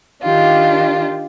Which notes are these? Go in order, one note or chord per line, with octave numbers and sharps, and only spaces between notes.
D#3 D4 F4 G4